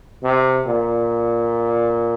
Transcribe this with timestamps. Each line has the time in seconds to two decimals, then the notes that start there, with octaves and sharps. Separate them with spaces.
0.23 C3
0.66 A#2